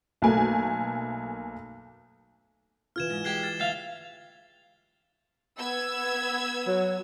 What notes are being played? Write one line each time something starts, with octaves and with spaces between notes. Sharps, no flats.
B1 A3 A#3 G#5
E3 F4 F6 G#6 E7
G#2
G#3 G4 G#6 C7 G7
F6 A6
D2 E5 F5 A6 C7
B3 E6 G#6
F#3